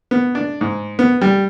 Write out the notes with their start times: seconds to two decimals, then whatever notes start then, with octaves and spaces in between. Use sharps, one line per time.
0.11 B3
0.35 D4
0.61 G#2
0.99 B3
1.21 G3